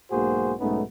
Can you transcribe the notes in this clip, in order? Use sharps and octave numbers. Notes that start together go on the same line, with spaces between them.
B1 G#2 A#3 F#4 G#4 C5
B1 G#2 A3 B3 C#4 D#4